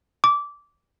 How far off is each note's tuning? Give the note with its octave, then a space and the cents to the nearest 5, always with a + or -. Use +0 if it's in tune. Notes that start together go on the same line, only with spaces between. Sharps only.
D6 -15